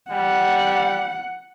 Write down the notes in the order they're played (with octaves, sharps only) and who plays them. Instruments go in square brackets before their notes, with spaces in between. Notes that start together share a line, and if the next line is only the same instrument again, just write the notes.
[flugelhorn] G3 [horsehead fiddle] F#5